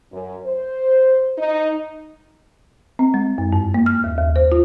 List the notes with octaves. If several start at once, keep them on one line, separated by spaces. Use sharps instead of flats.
F#2
C5
D#4
C4
G#3
F#2
G2
A#3
F6
D#2
D#2
C5
F4